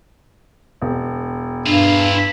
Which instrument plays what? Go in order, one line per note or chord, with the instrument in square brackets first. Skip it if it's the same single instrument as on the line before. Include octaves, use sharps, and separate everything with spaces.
[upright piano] E1
[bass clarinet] G2 [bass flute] D4 [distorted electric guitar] E4 F4